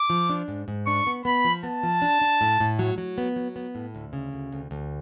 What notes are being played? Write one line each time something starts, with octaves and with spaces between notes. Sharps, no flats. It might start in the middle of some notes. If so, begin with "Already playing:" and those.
Already playing: D6
F3
D4
G#2
G#2
D4 C#6
B3
B3 B5
F3
B3 A5
F3
D4
D4
A2
A2
F#3
F#3
B3
F#3
B3
A2
D2
C#3
D2
D2
D2